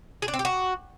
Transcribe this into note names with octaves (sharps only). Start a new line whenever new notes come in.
G#4
D4
C4
G4
F#4